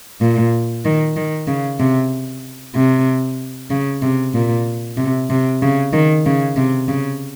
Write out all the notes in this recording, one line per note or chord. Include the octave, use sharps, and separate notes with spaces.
A#2
D#3
D#3
C#3
C3
C3
C#3
C3
A#2
C3
C3
C#3
D#3
C#3
C3
C#3